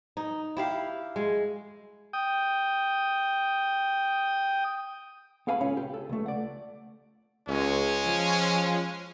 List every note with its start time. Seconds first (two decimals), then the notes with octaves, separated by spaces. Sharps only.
0.17 D#4
0.57 E4 G4 F5
1.16 G#3
2.13 G5 D#6
5.47 B3 A4 F5 G#5 A#5 B5
5.61 C#2 C#4 C#5 B5
5.77 G4
5.94 A4
6.09 C#2 A3
6.26 D5 F#5
7.48 C#2 G#3 C#4
8.06 F3